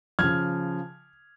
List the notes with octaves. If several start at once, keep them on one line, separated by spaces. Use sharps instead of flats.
C#3 F3 F6 G#6